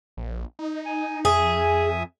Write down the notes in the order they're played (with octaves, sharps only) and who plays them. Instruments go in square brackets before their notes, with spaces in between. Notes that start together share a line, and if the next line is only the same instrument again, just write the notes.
[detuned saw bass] A#1
D#4
[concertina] G#5
[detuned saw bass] F2 [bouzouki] G#4 [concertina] E5 G#5 D#6